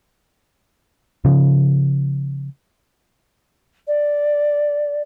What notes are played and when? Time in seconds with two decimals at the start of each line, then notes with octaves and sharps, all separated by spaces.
1.25 C#3 F3
3.87 D5